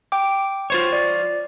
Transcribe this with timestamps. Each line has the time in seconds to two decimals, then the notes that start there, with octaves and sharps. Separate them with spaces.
0.12 G5 D6
0.70 F4 C5 C#5
0.93 D5